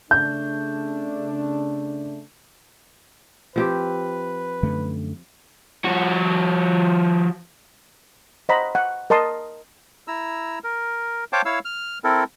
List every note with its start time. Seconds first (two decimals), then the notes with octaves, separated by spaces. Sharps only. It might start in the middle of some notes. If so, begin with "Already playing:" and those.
0.11 C#3 A3 D4 G6
3.56 F3 C4 G4 B4
4.63 F#2 D3 A3
5.85 F3 F#4
8.49 C5 D#5 F#5 A#5 B5
8.75 F#5
9.10 A#4 D#5 A5 C6 D#6
10.08 E4 A#5 E6
10.64 A#4
11.33 C5 C#5 F5 G5 A5 D6
11.45 E4 C#5 F5 E6
11.65 F6
12.04 C4 E4 A4 A#4